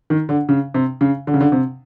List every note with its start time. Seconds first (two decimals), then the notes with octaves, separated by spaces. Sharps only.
0.10 D#3
0.29 D3
0.49 C#3
0.74 C3
1.01 C#3
1.27 D3
1.34 C#3
1.41 D3
1.52 C3